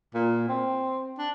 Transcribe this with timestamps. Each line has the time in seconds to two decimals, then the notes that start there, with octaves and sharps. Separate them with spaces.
0.15 A#2
0.49 C4
1.18 D4